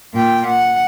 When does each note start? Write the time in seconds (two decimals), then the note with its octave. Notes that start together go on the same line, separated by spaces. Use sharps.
0.14 A#2 G5
0.47 F#5